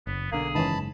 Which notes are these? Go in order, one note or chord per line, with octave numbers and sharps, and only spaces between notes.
F#1 B3
B1 D3 A#3 G#4
F#1 G#2 D#3 E3 C#4 A5 B5